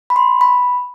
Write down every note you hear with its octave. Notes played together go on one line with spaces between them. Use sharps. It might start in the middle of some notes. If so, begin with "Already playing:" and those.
B5
C6
B5